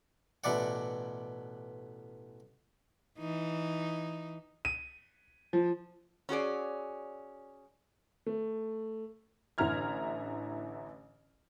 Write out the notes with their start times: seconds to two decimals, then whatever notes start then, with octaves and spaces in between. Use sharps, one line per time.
0.44 A1 B2 E4 D5 F#5
3.18 E3 D#4
4.65 D#7
5.53 F3
6.29 C#4 F#4 G#4 D5
8.26 A3
9.58 A1 D3 E4 A#5 F6 G#6